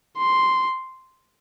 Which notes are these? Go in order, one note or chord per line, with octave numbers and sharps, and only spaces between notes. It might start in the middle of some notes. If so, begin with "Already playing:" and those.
C6